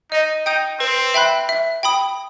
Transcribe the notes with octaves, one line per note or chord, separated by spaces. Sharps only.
D#4 D#5
D#4 G5 D#6 G6
C4 B4
E5 G5 B5 F#6
E5
G5 B5 D#6